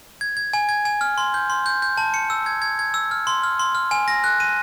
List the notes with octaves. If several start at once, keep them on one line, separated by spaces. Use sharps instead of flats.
G#6
G#6
G#5
G#6
G#5
F6
C6
G6
C6
G6
G6
A5
C#7
E6
G#6
G#6
G#6
E6
F6
C6
F6
C6
F6
G#5
A#6
F#6
D#7